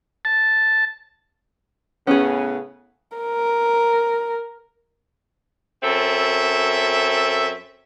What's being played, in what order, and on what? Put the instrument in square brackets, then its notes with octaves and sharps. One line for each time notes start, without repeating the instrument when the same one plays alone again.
[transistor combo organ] A5
[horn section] A2 C#3 B3 [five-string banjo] C#4 G#4
[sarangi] A#4
[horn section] F#2 C4 A4 E5